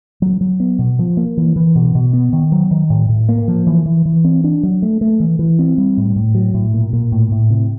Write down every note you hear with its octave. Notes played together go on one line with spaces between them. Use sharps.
F#3
F#3
B3
B2
F3
A#3
E3
E3
B2
B2
B3
D#3
F#3
D#3
A2
A2
A#3
F3
E3
E3
E3
C4
D4
F#3
A3
A3
E3
E3
C4
G3
A2
A2
F#3
A2
A#2
A#2
A2
A2
C3